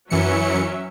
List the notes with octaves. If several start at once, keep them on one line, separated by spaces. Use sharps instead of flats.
F#2 E3 F#3 C#4 E5 C#7